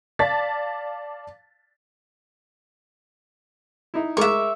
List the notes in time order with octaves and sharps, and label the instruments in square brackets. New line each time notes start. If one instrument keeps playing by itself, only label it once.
[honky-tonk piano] D5 F5 A5 A6 B6
[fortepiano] D#4 E4
[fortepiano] G#3 A#4 D6 [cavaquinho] E5 C#6